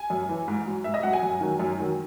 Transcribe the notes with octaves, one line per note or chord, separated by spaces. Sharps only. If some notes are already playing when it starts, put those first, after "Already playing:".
Already playing: G#5
F#2
E3
G#2
F#3
G#2 E5
D#5
F#3 F#5
G#5
F#2
D#3 F#3
F#2
D#3 F#3